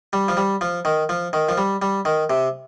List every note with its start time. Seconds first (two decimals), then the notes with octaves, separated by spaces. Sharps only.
0.13 G3
0.28 F3
0.37 G3
0.61 F3
0.85 D#3
1.09 F3
1.33 D#3
1.49 F3
1.57 G3
1.82 G3
2.05 D#3
2.30 C3